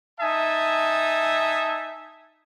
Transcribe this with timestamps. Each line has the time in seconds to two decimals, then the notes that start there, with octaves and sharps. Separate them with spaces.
0.20 D#4 E5 G#5 A5 D#6